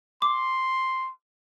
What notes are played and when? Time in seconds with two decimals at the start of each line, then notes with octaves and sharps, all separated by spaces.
0.22 C6 D6